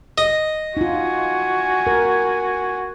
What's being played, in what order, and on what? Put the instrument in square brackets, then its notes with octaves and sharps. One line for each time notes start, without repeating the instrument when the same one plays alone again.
[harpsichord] D#5
[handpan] D#4 F4 [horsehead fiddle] F#4 G#5
[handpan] A#4